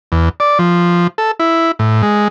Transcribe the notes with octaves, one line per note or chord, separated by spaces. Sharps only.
E2
D5
F3
A4
E4
A2
G#3